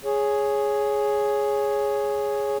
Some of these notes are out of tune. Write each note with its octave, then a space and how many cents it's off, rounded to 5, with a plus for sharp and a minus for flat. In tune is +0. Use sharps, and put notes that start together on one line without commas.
G#4 +0 C#5 +0